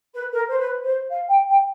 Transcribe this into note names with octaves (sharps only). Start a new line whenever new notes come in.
B4
A#4
C5
B4
C5
F5
G5
G5